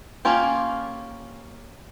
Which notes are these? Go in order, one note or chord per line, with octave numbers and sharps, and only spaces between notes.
A#3 C#4 F4 G4